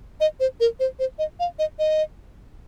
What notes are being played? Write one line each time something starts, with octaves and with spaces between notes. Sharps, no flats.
D#5
C5
A#4
C5
C5
D#5
F5
D#5
D#5